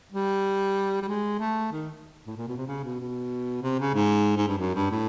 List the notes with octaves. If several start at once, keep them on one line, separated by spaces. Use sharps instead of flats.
G3
G3
G#3
A3
D#3
A2
A#2
B2
C3
C#3
B2
B2
C3
C#3
G#2
G#2
G2
F#2
G2
A2